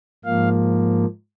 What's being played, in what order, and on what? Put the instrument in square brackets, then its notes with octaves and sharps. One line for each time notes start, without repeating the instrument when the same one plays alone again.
[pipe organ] G#2 F3 A#3 F5